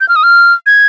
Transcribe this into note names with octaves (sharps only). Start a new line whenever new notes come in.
G6
F6
D#6
F6
G#6